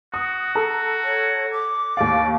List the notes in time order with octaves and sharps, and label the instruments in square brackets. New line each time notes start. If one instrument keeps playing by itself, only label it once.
[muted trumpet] F#4 [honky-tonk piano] D#6
[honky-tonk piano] A4 A#5
[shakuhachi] C#5
D6
[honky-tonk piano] D#2 F5 [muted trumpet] D5